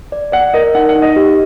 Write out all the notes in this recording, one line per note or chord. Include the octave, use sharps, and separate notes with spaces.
D5
D5 F#5
A#4 D#5
D#4 F#5
F#5
D#4
D#5
G4